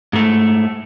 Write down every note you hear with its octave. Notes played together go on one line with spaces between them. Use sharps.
G#2 A3